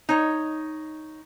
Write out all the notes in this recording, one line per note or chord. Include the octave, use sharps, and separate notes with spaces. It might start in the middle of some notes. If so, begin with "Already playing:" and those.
D#4 C#5